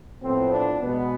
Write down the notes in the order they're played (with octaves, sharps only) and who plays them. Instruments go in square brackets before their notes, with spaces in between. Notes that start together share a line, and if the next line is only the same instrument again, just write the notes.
[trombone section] A2 F3 B3 C4
D4
B2 G#3 B3